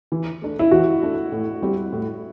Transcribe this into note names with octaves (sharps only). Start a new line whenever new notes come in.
E3
A3 D4
E4
E3 F#4
A3 D4
A2
G3 C4 G4
A2